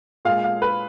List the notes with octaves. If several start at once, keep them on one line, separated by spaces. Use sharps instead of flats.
A#2 G#3 F5
F5
B4